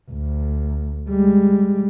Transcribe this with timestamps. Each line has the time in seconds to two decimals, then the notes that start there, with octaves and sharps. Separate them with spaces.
0.11 D2
1.10 G3 G#3